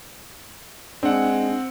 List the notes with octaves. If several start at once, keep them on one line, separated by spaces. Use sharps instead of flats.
G#3 C4 D4 F#5